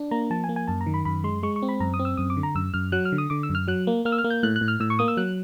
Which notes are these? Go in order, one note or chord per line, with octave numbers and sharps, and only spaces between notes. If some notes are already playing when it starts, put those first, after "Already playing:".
Already playing: D4
A#3 A#5
F3 A5
G#5
A#3
G#5
F#2 A5
A#5
D#3
B5
F#2 B5
G#3 C6
G#3 C#6
C#6
C4
B5
F#2 A#5
D#6
C4
E6
F#2 D#6
D6
D3
A#5
F#2 E6
F#2 F6
F#3 F#6
F6
D3
D#6
D3 D6
E6
F#2
F6
F#3 F#6
A#3
A#3 F6
E6
F6
A#3
G6
A2 F#6
F#6
A2
F6
A2 E6
C#6
A#3 D#6
E6
F#3 F#6